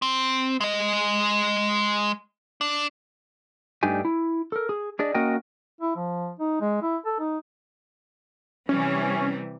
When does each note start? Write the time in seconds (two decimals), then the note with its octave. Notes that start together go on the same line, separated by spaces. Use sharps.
0.02 C4
0.61 G#3 D#5
2.61 D4
3.83 G2 A3 D4 D#4 G4 G#5
4.05 E4
4.52 A4 A#4
4.69 G#4
4.99 D4 G#4 D5 D#5
5.14 A#3 C#4 F#4 A#4 D#5 G5
5.81 E4
5.96 F3
6.40 D#4
6.61 G#3
6.82 E4
7.06 A4
7.20 D#4
8.69 C3 E3 G3 C#4